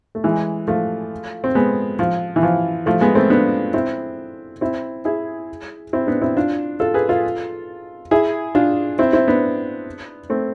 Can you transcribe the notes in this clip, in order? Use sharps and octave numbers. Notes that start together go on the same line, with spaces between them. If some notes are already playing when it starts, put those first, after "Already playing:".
A3
E3 G#3
F3 A3
C4
G#3 B3
F3
E3
F3
F3 A3
G#3 B3
A3 C4
B3 D4
C4 E4
C4 E4
E4 G#4
C4 E4
B3 D4
C4 E4
D4 F4
F4 A4
G#4 B4
F4 A4
E4 G#4
D4 F4
C4 E4
C4 E4
B3 D4
A3 C4